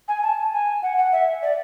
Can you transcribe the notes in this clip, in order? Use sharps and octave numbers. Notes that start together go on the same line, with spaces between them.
G#5
A5
G#5
F#5
F#5
E5
D5